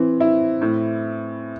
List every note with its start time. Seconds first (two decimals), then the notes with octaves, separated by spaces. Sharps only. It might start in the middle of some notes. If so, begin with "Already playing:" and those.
Already playing: E3 C4
0.20 E4
0.61 A2